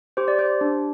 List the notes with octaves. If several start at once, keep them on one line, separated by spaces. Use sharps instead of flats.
G4 C5
D5
C5
D4